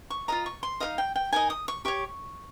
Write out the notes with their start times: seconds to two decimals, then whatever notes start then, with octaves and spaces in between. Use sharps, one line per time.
0.10 C#6
0.28 F4 A#4 D#5 A#5
0.46 C#6
0.63 C6
0.80 D#4 A#4 D#5 F5
0.98 G5
1.16 G5
1.33 D#4 A#4 D#5 G#5
1.50 D#6
1.68 C#6
1.85 G4 C#5 C#6